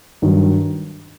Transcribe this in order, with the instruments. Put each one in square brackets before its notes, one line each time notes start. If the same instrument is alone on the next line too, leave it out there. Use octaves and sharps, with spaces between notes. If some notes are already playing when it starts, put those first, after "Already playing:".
[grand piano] G2 D#3 F#3